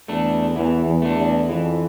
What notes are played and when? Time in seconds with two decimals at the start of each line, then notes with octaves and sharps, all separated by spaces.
0.08 E2 A3 D4
0.56 E2 E3
0.86 E2
1.02 A3 D4
1.18 E2
1.49 F2 E3